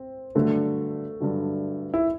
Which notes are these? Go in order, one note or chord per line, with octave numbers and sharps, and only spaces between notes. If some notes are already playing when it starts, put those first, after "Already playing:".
Already playing: C4
G2 D3 F#3 A3
G2 D3 F#3
E4